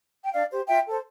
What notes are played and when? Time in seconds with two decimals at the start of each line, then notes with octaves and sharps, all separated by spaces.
0.24 G5
0.32 D4 D5 F5
0.51 G4 C5
0.68 F4 E5 G5
0.86 A4 C5